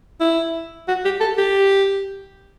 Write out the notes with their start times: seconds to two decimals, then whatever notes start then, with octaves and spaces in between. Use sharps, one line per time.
0.20 E4
0.88 F#4
1.04 G4
1.20 A4
1.38 G4